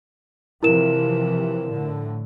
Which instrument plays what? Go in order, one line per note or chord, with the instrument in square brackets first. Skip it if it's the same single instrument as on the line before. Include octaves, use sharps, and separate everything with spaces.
[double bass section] C3 E3 F3 [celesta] E4 A#4 E7
[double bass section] A2 D3